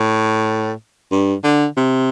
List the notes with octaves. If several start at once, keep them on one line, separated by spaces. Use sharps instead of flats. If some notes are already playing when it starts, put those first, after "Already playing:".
Already playing: A2
G2
D3
C3